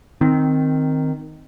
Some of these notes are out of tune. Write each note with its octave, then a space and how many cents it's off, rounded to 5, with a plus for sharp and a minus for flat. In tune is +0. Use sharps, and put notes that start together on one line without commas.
D#3 -5 C4 +0